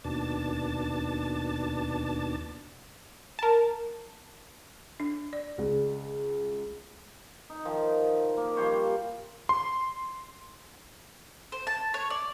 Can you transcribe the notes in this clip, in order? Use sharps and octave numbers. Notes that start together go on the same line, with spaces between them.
D#2 B2 D4 A5
A#4 A5
D4
D5
C#2
D#4
D#3 F3
A#3
F3 G3 C5 C#5
C6
C5
A5
C#5
D5